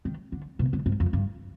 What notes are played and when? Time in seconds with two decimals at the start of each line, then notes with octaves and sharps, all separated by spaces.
0.05 D#3
0.32 D3
0.59 B2
0.73 D3
0.86 G#2
1.00 F2
1.13 G2